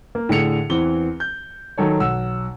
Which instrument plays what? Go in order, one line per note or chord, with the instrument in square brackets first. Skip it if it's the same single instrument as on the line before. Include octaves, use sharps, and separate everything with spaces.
[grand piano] A#3
A2 D3 G#4 C#7 F7
E2 E3 C4 G7
G6
D#3 F#3 A4 C#5
B1 F#5 E6